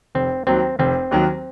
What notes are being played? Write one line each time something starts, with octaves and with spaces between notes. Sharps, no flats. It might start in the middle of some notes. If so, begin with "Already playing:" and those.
F1 C4
D#2 D#3 F#3 C4
F1 C4
D#2 D#3 F#3